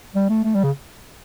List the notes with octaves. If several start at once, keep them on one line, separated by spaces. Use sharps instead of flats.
G3
A3
A3
G3
C#3